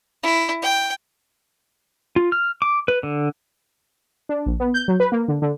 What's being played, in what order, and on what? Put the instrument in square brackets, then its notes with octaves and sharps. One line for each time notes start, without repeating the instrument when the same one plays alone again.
[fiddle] E4
G5
[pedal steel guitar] F4
F6
D6
B4
D3
[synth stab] D4
A#1
B3
G6
F#3
B4
A#3
D3
D3